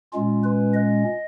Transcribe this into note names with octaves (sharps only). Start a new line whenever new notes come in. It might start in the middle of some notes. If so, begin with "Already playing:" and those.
A#2 G#3 C#4 F4
B4
D#5